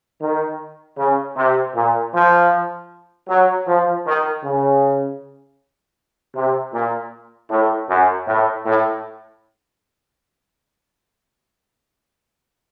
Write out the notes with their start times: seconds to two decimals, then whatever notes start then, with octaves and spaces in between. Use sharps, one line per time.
0.21 D#3
0.97 C#3
1.37 C3
1.75 A#2
2.13 F3
3.29 F#3
3.67 F3
4.06 D#3
4.43 C#3
6.35 C3
6.73 A#2
7.50 A2
7.89 F#2
8.27 A2
8.65 A2